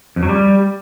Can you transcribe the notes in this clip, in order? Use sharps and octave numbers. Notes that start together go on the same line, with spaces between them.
F2
F#3
G3